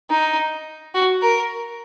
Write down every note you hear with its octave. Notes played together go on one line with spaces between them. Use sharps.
D#4
F#4
A#4